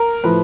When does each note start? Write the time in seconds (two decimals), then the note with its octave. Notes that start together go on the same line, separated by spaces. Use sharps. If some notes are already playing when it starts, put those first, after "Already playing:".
Already playing: A#4
0.23 A2 F3 A3 B4